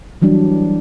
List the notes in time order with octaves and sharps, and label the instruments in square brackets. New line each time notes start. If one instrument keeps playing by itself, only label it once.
[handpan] E3 F#3 G3 D4